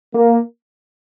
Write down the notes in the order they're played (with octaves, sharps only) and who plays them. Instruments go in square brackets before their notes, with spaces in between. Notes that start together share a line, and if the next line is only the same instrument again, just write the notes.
[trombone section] A#3